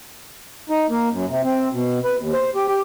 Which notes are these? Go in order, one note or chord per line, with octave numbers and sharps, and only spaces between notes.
D#4
A#3
F#2
C3
C4
B2
B4
D#2
C5
G4
G4